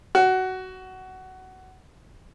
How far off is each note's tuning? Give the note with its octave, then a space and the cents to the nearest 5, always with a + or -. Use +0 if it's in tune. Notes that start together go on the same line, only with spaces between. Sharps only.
F#4 +15